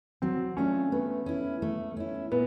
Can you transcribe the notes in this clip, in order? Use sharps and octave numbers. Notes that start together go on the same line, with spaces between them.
F#3 C4
A3 C#4 D4 F4
A3 B3
C#4 E4
A3
C#4 E4
A#2 B3